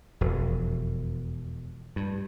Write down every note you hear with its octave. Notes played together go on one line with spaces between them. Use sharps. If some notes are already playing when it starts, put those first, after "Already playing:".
E1 F2
G2